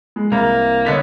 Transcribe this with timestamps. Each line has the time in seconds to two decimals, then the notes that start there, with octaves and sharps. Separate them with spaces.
0.16 G#3
0.32 C2 A#3 A#5
0.86 D3 B3 C#5 D#5 B6